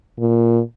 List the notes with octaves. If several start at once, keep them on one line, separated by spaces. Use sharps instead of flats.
A#2